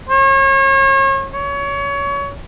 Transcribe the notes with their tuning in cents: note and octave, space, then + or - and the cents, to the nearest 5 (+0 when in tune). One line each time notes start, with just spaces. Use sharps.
C#5 -35
C#5 +25